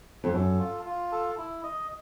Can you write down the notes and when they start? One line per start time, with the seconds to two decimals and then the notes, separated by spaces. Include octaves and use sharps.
0.24 F2
0.34 F#2 A4
0.59 F4
0.85 F4
1.12 A4
1.38 E4
1.63 D#5